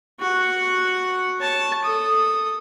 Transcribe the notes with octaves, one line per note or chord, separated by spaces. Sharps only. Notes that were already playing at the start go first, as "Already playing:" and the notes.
F#4 F#5
C#5 A5
A4 D#6